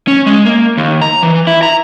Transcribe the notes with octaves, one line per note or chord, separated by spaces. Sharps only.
C#4
G#3
A#3
D#2
A#5
E3
E4
A#5